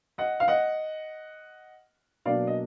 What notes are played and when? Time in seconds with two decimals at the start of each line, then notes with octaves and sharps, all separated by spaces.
0.18 D#5 F#5
0.40 F5
0.48 D#5 F#5
2.26 B2 F#3 A#3 D4 D5 F5
2.47 D#5